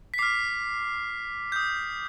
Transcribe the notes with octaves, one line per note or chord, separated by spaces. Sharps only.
B6
D6 F6 C7
D#6 G6